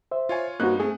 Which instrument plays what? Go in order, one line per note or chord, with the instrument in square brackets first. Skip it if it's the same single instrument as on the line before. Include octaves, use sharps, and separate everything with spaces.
[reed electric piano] C5 E5
[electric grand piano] F4 C#5 G#5
[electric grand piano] G2 D#4 F#6 [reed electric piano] A#3 C4 F#4
[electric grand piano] A3 [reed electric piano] C4 G#4